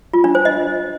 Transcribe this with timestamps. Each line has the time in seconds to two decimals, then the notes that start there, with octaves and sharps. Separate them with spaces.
0.13 F4
0.24 D4
0.35 C5
0.45 D#5